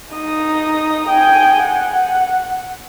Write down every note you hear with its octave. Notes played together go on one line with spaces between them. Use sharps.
D#4 D#6
G5 G#5
F#5